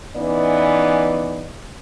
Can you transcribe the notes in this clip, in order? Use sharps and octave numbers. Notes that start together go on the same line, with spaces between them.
E3 B3 C#4 D#4 D5